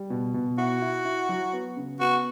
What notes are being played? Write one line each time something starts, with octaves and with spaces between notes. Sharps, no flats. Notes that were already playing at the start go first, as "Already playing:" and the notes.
Already playing: G3
B2
B2
E4 F#4
E4
E4
F#3
B3
C#3
B3 F#4